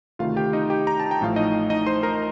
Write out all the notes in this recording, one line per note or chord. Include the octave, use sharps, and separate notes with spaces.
D2 C3 D#3 A3 F4 F5
G4 G5
D#4 D#5
G4 G5
A#5
A5
G5
A1 A2 F3 A3 F5
D#4 D#5
D#4 D#5
C5 C6
A#4 A#5